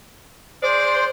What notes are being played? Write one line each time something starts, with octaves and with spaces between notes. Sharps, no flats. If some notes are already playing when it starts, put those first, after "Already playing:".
G#3 C5 D5